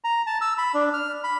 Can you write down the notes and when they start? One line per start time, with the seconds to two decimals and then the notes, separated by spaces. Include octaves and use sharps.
0.04 A#5
0.27 A5
0.41 E6
0.58 B5
0.74 D4
0.94 F6
1.24 B5